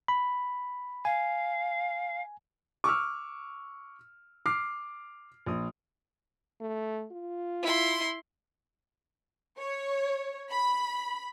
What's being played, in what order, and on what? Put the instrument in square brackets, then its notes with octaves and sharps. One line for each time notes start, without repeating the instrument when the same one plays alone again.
[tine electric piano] B5
[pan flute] F5 [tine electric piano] G#5
[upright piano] C#6 D6 E6 F6
D6 F6 C7
A#1 D#6
[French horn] A3
F4
[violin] E4 C6
[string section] C#5
B5